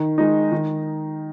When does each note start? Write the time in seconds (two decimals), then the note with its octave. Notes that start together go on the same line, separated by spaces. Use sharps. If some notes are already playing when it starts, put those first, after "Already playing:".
Already playing: D#3
0.18 G#3 D#4
0.52 D#3